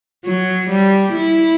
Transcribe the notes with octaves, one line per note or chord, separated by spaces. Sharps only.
F#3
G3
E4